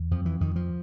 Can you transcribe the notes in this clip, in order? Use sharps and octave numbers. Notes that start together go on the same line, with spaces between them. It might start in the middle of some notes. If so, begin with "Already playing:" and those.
Already playing: E2
F2 F3
E3
F2 D#3
F3